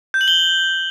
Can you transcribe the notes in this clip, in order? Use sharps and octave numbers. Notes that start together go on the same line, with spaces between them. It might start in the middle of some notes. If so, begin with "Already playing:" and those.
G6
F#7
G7